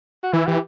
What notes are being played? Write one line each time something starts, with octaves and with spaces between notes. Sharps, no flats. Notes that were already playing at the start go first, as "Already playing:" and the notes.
F#4
E3 E4
E3 G4